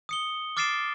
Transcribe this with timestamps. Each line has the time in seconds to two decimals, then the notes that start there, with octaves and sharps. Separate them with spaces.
0.09 D#6 C#7 G7
0.57 D6 F6 A6 C7 D7 E7